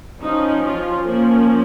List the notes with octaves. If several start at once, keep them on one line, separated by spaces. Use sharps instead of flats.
F3 C#4 D#4
F4
F3 A#3 C#4 A#4